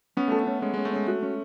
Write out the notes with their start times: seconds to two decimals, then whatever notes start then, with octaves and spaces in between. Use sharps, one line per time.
0.17 B3 C#4
0.28 A3 A4
0.40 B3
0.47 C#4
0.62 G#3 C#4
0.74 G#3 C#4
0.85 A3
0.92 G#3 C#4
1.07 A3 F#4
1.22 C#4